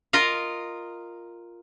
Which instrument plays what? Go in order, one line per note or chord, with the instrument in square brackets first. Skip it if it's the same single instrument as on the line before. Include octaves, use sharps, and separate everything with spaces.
[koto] F4 A#4 D#5 F5